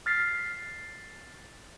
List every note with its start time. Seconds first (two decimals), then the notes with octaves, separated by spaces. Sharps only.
0.06 F6 A6 B6 C7